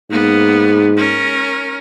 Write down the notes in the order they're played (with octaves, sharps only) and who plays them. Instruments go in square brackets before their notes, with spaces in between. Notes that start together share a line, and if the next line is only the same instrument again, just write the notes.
[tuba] G#2 [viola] A#3 B3
[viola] C#4 A#4